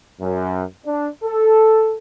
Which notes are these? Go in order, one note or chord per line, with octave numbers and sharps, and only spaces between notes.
F#2
D4
A4